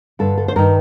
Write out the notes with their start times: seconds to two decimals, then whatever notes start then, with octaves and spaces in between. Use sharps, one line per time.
0.19 G2 D3 A4
0.38 A4
0.48 C5
0.56 G2 D#3 A#4